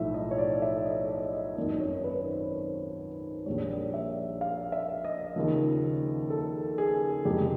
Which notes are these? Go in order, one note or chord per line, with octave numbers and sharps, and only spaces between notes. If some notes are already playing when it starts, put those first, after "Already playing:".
Already playing: B1 A2 F3 E5
D#5
C#5
D5
E5
D#5
D5
D#5
G#1 F#2 D#3 D5
C#5
B4
C5
A#1 A#2 G3 C#5
D5
E5
F5
E5
D#5
D#2 C#3 F3
A4
G#4
F2 C3 E3 G#3 G4